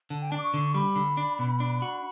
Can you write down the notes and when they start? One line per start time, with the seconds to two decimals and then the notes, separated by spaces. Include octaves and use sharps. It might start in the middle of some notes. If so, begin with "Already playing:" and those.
0.10 D3 A5
0.21 G5
0.31 D4 A5
0.38 D6
0.43 C#6
0.54 D3
0.75 G3 B5
0.96 D3
1.17 D4
1.39 B2
1.60 D4
1.82 F#4